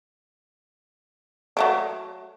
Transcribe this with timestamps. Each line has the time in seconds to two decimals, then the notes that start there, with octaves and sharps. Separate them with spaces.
1.57 F#3 A3 D4